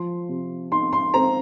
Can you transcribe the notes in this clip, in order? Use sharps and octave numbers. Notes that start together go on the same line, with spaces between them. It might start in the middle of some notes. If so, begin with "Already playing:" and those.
Already playing: F3 C6
C3
D#4 C6
C6
C4 A#5